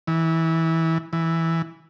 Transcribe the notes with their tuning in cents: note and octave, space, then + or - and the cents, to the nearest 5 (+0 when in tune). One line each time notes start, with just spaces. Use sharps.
E3 -20
E3 -5